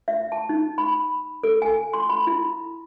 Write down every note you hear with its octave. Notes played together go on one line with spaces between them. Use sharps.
E5
A5
D#4
B5
A4
G#5
C6
B5
E4